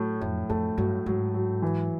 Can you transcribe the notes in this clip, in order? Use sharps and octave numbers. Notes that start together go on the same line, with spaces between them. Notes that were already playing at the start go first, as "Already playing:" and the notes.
Already playing: A2 F#3 A3
F2 A2
F2 A3
G2 F#3
G#2 F#3
F#3
E3